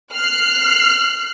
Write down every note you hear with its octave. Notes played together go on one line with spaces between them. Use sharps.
F6 F#6 C7